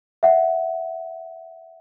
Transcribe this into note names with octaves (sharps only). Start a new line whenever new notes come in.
E5 F#5